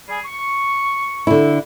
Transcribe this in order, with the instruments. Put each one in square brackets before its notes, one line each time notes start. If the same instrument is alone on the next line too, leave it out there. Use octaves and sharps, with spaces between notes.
[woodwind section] G3 G#4
C#6
[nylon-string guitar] D3 E4